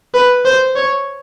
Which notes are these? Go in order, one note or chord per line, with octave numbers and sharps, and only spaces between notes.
B4
C5
C#5